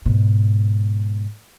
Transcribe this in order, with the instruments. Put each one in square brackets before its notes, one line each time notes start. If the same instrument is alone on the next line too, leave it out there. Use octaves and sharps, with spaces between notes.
[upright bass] G#2 B2